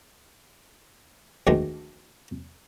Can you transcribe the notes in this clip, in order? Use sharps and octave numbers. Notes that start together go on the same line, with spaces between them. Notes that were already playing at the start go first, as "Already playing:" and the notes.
D2 D#3 G#3 A3